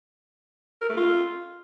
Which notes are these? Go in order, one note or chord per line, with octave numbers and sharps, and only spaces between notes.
A#4
A3
F4